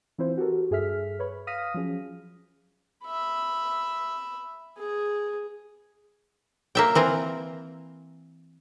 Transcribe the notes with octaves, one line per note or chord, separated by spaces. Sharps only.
E3 C4 E4 F4 C5
F#4 G4 A4 A#4
G2 G#4 A4 E5 F6 B6
B4 C#5 B5
F5 D#6 F6 A#6 B6 D#7
F3 F#3 C#4 G#4
E5 B5
G#4
A#3 E5 G5
E3 C4 A#4